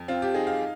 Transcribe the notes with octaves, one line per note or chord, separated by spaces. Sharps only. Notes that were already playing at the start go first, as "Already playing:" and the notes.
Already playing: F2
C4 F4
G4
D#4 G#4
F5